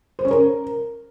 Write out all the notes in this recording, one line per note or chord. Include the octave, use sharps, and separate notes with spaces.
C5
C#4
A#4